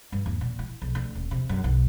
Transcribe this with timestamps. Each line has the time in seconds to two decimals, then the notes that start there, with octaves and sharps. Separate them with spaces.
0.12 G2
0.26 D#2
0.41 A#2
0.59 E4
0.82 B1
0.95 D2
1.15 D#1
1.31 C3
1.49 F#2
1.64 B1